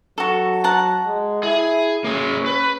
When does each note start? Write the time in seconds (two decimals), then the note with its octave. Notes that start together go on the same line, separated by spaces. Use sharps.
0.18 F#3 F#4 A4
0.64 F#5 A5 A#5
1.05 G#3
1.43 E4 G#4
2.04 A#3 C#4 G#4
2.46 B4